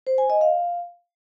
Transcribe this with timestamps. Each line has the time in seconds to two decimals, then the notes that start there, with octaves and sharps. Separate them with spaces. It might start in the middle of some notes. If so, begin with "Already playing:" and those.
0.07 C5
0.18 G#5
0.30 D#5
0.41 F5